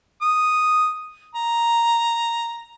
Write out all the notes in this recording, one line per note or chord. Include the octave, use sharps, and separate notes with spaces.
D#6
A#5